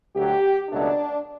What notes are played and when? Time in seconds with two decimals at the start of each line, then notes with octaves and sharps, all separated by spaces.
0.15 D2 D3 F#3 G4
0.69 C#2 B2 F#3 A3 D4